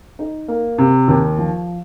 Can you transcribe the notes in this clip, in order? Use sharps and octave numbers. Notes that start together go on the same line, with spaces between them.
D#4
A#3
C3
D#2
F3